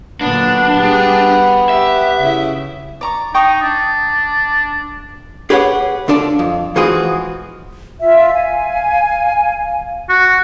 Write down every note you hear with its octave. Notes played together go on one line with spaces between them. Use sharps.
A#2 D3 F#3 B3 D4
G3 G4 G#4
G4 E5
C#3 E4
D5 A#5 C#6
D#4 G5 C#6 D#6
D4
G4 G#4 B4 C#5 E5 F#5
C#2 D3 D4 D5 A5
F2
E3 F3 G#3 F#4 G#4
F4 E5
F5 G#5
F#4